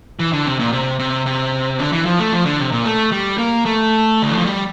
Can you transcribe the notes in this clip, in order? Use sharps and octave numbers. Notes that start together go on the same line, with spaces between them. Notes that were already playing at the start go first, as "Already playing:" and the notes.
E3
D3
C3
A#2
C3
C3
C3
D3
E3
F3
A3
F3
D3
C3
A#2
A3
G3
A#3
A3
D3
E3
F3
G3